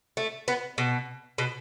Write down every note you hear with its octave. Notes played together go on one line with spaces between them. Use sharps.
A3
B3
B2
B2